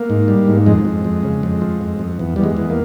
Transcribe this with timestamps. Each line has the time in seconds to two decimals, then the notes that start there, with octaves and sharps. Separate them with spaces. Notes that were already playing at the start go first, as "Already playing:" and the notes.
Already playing: A#3
0.10 G#2
0.28 G3
0.48 G#2
0.66 F2 G#3
0.85 F2
1.04 F2
1.23 C#3
1.43 F2
1.61 F3
1.81 F2
1.99 F2
2.19 E2
2.36 E2 G3
2.44 G#3
2.56 E2
2.70 A#3